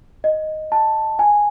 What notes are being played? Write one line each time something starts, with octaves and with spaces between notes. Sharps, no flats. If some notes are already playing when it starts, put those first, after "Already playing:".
D#5
A5
G#5